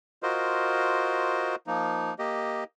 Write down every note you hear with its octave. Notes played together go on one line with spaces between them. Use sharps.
F4 F#4 A#4 C5 D#5
F3 A#3 D#4
A#3 G4 D#5